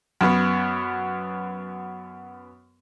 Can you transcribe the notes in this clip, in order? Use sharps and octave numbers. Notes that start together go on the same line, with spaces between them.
F#2 B3